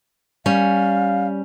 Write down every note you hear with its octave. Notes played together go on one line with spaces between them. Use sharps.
G3 C#4 F5